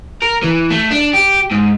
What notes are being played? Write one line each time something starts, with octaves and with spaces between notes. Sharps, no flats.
A#4
E3
A3
D4
G4
G#2